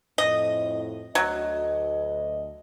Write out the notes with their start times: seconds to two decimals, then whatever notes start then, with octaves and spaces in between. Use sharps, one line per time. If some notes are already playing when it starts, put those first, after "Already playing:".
0.18 F2 A2 D#5
1.15 D2 F#3 D#5